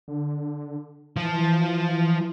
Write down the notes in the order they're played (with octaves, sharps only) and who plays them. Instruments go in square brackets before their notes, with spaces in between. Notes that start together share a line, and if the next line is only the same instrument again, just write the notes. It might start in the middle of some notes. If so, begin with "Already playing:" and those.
[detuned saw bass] D3
[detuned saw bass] E3 [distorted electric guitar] F3